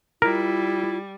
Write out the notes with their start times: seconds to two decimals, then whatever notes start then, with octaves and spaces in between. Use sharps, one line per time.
0.22 G3 E4 F4 A#4